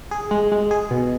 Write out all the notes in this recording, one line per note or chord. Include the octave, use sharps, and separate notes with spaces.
G#4
G#3
G#3
G#4
B2